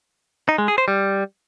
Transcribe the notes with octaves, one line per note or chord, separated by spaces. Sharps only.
D#4
G#3
G#4
C5
G3